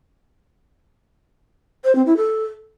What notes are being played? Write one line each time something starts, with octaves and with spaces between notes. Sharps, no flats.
C5
C4
E4
A4